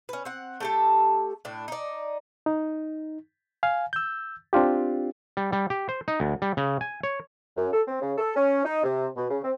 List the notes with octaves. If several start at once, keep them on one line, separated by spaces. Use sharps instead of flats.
C#4 B4
C4 F#5
A3 G4 A4
A2 D4
D#4 D5
D#4
F5 G#5
E6 G6
C4 D4 F4 G4
G3
G3
G4
C5
D#4
D2
G3
C#3
G#5
C#5
F#2
A4
C4
C#3
A4
C#4
D#4
C3
B2
C#3
C4